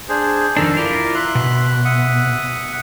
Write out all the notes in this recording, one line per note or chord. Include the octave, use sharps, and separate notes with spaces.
D4 G#4 C5
F2 D#3 D4 A4 A#4
E4 F4 A#4 D5
E5 C6 F#6
B2
E5 F#5 D#6